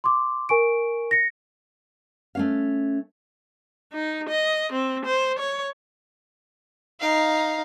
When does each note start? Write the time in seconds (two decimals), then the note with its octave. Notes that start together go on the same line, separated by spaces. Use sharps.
0.04 C6 D6
0.49 A#4 G#5 C#6 D7
1.11 A#6 C#7
2.35 A3 C#4 F5
3.93 D#4
4.29 D#5
4.73 C4
5.05 C5
5.39 C#5
7.00 D#4 F5